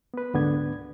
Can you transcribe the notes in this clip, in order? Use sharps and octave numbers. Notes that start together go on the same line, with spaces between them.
B3 B4
D2 G#2 D3 B3 D4 G#6